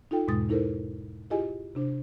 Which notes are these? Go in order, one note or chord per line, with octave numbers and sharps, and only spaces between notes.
D#4 F4 A4 G5
E2 G#2 B2 G#3 D#6 A6
D#4 E4 A4 A#4 C5
E4 F4 G4 G#4 D#5 G#5
C3 D4 C5